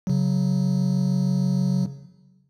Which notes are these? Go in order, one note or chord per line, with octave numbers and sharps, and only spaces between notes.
C#3 F#3